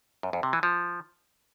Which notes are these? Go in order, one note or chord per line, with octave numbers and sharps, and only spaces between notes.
F#2
F2
C3
E3
F3